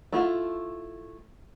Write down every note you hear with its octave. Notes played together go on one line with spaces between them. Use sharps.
A3 E4 F4